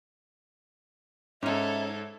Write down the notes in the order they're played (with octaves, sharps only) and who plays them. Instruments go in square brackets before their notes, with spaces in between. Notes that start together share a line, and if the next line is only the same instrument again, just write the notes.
[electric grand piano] G#2 [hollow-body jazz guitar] C#4 D#4 [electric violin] A4 C#5 [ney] E5